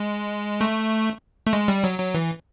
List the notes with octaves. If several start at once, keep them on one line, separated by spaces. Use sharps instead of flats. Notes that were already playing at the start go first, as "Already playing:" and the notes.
Already playing: G#3
A3
A3
G#3
G3
F#3
F#3
E3